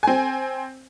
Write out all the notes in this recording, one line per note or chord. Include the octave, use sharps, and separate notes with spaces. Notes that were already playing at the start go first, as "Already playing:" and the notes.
C4 G#5